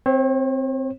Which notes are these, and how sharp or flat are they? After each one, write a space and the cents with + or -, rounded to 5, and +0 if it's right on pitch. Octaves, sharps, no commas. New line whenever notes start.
C4 +0 C#5 -45